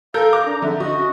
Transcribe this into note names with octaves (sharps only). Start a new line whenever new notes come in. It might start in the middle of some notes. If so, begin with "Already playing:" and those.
A4 A#4 F5 A#5 G6
A#5 D6
D4
D3 E5
F#4 D#5
C#4